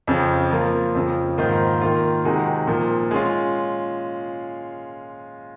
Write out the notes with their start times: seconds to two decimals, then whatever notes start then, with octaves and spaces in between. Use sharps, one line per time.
0.07 F2 C#3 F3
0.51 F3 A#3 F4
0.95 F2 C#3 F3
1.38 G#2 D#3 A#3 F4 C5
1.81 D#3 A#3 F4
2.25 C3 D#3 G#3 D#4 F#4
2.67 A#2 F3 A#3
3.11 G#3 C#4 F4